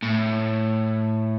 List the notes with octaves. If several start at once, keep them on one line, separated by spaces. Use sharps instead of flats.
A2